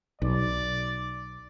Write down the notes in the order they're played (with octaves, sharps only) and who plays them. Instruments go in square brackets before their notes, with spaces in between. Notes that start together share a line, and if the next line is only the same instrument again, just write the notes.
[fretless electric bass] B1 [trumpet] D5